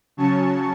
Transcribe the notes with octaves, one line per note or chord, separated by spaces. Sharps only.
C#3 F#3 C#4 A5 C#6